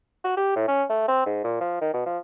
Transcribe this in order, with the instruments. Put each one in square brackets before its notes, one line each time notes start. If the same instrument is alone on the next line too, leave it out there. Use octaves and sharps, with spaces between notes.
[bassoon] F#4
G4
A2
C#4
A3
C4
G#2
A#2
F3
D#3
B2
F3